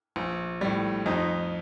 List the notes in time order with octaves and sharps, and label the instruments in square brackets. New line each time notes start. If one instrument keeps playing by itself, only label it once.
[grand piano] A#1
A2 G3
F2 D#4